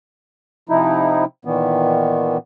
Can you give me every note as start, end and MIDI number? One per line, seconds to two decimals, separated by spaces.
0.69 1.25 48
0.69 1.25 53
0.69 1.25 63
0.69 1.25 64
1.45 2.37 46
1.45 2.37 51
1.45 2.37 52
1.45 2.37 59